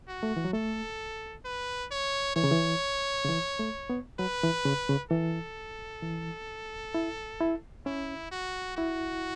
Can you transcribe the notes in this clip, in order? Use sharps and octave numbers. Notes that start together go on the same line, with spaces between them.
F#4
A3
E3
F#3
A3 A4
B4
C#5
E3 C#5
C#3
E3
C#3
E3
A3
B3
F#3 B4
E3
C#3
C#3
E3 A4
E3
E4
E4
C#4 E4
F#4
E4 F#4